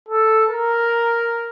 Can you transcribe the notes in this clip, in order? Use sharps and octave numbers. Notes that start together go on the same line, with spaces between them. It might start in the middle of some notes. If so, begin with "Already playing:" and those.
A4
A#4